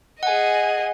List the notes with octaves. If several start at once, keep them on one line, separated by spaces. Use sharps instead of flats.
G#4 D#5 F#5 G#5